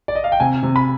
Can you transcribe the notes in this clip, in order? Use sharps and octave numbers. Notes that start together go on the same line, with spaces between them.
D5
D#5
F5
G5
C3 G#5
C3
B5